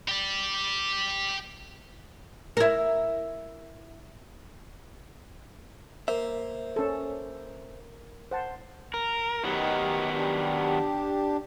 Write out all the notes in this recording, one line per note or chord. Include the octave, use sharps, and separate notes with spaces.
G4 D5
E4 A#4
A#3 C5 E5
C#4 A4
C5 F#5 A5
A#4
D#3 F#3 B3 D#4 G4
D4 G4